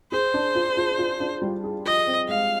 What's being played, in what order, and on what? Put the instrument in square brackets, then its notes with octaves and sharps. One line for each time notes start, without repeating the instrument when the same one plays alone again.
[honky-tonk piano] G#4 [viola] C5
[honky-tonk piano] D4
F4
F4
F4
D4
G3
G#4
[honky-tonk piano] F3 [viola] D#5
[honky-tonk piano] C4
[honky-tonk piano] G#3 [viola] F5